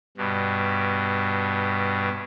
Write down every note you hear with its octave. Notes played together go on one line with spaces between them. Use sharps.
G2 B2